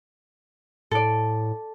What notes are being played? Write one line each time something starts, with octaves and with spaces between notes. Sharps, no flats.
A2 A4 D5